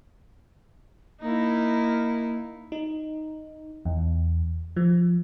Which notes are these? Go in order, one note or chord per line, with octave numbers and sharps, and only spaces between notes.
A#3 D#4 E4
D#4
E2
F3